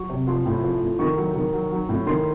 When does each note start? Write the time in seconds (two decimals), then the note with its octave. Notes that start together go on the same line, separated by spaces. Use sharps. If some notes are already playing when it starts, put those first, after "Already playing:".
Already playing: F#3 C#6
0.09 C3
0.27 F3 C6
0.46 A2
0.63 F3
0.81 A2
0.99 D#3 C#6
1.17 F#3
1.35 D#3
1.53 F#3
1.71 F#3
1.89 A2
2.06 D#3 C6